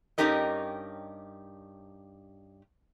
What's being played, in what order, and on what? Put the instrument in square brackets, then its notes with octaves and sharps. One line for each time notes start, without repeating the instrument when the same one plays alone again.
[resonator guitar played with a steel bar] G2 C#4 D#4 G4 A#4 D#5